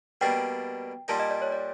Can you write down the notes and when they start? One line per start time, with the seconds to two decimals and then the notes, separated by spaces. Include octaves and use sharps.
0.21 B2 G3 A#3 D4 G5
1.08 A#2 G3 A#3 D#4 A5
1.20 D#5
1.30 D5
1.42 C#5
1.52 D5